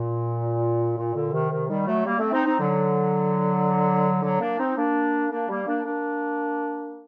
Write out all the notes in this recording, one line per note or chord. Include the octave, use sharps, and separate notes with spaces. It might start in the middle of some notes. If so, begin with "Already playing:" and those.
Already playing: A#2
A#2
A#2 D3
C3 D#3
C3 D#3
D#3 G3
F#3 A3
G3 A#3
A3 C4
C4 D#4
C4 D#4
D3 F#3
D3 F#3
A#3 D4
C4 D#4
A#3 D4
A#3 D4
G3 A#3
A#3 D4
A#3 D4